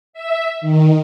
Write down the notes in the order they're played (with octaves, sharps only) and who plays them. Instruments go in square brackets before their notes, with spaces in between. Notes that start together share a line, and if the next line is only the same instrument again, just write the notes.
[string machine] E5
D#3